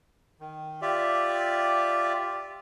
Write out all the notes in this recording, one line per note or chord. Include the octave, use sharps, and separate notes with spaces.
D#3
F4 G4 D5 E5